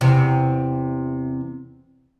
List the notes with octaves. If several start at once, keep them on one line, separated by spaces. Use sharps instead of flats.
E2 C3